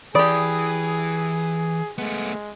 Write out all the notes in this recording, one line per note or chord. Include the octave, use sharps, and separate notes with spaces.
E3 G4 G#4 D5 B5 D#6 D7
G#3 A3 B3